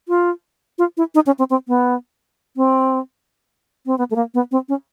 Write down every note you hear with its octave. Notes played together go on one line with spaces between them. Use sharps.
F4
F4
E4
D#4
C#4
C4
C4
B3
C4
C4
B3
A3
A#3
B3
C4
C#4